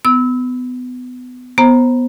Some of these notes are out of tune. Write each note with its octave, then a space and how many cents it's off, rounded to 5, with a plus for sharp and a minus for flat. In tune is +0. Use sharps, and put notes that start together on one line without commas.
B3 +25 E6 -25
B3 +0 C5 +20 A#5 +0